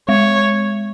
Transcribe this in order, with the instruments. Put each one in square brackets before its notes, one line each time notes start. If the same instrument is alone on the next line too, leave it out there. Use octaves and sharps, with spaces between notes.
[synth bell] G#3 [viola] C#5